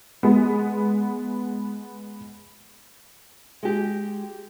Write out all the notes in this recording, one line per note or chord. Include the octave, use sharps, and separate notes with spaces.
G#3 B3
G#3 G4